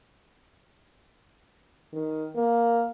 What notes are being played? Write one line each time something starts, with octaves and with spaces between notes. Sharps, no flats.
D#3
A#3